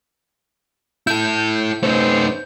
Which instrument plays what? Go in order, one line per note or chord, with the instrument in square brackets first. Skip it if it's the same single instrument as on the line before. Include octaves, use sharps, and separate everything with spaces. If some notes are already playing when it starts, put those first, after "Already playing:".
[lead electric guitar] E4 A4 [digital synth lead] G6
[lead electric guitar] A3 D#4 [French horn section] C#4 B4 C5